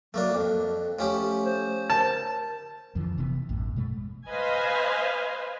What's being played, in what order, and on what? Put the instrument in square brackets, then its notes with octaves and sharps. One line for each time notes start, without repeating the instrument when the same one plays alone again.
[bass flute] F#3 [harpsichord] A3 A#3 D4
[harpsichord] F2 [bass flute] A4
[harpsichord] F3 C#4 G4 [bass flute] A3
[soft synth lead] C5
[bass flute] A#4 [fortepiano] A5
[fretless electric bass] F2 D3 E3 F3
F1 C3 E3 B3
A1 F#2 A2
B2 G#3 A3
[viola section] B4 C5 D#5 F5 G#5